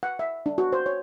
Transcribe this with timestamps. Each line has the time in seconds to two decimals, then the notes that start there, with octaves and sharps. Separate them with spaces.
0.03 F#5
0.19 E5
0.46 D4
0.58 F#4
0.73 C5
0.86 C#5